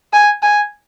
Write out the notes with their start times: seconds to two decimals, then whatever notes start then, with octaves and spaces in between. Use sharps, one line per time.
0.13 G#5
0.42 G#5